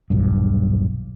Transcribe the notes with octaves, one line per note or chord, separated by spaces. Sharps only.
D#1 B1 G2